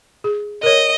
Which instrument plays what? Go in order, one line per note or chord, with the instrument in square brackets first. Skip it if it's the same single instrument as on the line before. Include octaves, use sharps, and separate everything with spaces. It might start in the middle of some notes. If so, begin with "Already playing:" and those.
[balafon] G#4
[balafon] A#4 C#5 [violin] D#5